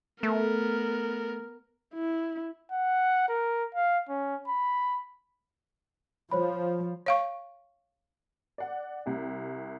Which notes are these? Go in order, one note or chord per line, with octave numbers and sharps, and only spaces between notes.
A3 B3 A#4
E4
F#5
A#4
F5
C#4
B5
F3 C5 C#5 B5
C#5 F5 C#6
D5 F#5
C2 G4